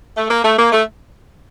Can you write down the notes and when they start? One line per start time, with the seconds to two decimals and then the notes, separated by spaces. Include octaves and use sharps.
0.17 A3
0.31 A#3
0.44 A3
0.59 A#3
0.72 A3